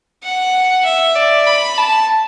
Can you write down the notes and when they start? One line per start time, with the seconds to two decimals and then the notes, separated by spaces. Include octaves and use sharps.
0.24 F#5
0.85 E5
1.16 D5
1.47 B5
1.77 A5